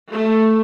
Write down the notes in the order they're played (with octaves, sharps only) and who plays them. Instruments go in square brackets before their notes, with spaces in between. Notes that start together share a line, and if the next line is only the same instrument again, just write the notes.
[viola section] A3